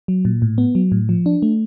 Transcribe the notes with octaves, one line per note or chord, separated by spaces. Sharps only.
F#3
A#2
A2
B3
F#3
A2
F3
D4
A3